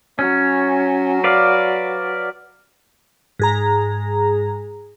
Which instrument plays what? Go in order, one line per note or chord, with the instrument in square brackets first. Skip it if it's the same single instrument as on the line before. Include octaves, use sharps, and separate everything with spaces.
[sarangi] F#3 [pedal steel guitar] C#4
[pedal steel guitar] B4 D5 F5
[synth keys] G#2 G#4 A#5